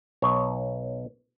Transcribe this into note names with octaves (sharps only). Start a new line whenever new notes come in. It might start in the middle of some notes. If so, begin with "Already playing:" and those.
B1 C#5